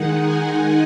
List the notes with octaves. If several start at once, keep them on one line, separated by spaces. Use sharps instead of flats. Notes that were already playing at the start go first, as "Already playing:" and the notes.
Already playing: D#3 G#3 D#4 F#5
G#5